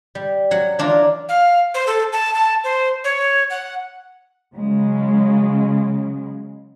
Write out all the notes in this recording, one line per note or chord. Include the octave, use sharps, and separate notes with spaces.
G3
F#3 F#5
E3 D4 F4 A#5
F5
C5
A4
A5
A5
C5
C#5
F#5
C#3 F#3 G#3